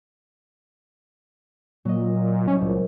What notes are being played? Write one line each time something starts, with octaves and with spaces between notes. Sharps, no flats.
A#2 F#3 D#5
C2 C#4
C#2 A#2